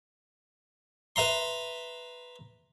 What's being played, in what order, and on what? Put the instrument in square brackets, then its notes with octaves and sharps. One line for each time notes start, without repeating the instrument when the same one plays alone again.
[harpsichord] B4 E5 A#5 C6